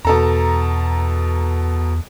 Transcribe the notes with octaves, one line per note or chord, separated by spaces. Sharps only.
E2 B2 A4 A#5